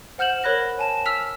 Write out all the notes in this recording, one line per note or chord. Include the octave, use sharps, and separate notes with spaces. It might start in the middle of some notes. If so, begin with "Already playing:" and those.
C5 F#5 F6 G6 E7 F#7
A#4 C#5 B5 F#6 A#6 F#7
G#5 A5 E7
E6 F6 B6 F7